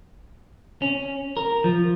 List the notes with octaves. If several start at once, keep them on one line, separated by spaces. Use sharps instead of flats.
C#4
A#4
F3